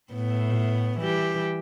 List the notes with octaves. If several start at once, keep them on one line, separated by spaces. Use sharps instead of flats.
A2 B3
E3 G3 G4